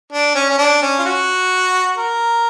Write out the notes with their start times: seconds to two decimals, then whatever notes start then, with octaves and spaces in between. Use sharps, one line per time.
0.12 D4
0.35 C#4
0.50 C#4
0.58 D4
0.82 C#4
0.99 F4
1.05 F#4
1.97 A#4